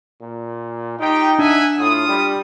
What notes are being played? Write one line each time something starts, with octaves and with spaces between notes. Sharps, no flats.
A#2
D#4 F4 G4 G5
D4 E5 F#5 G#5
A2 F4 D#6
G3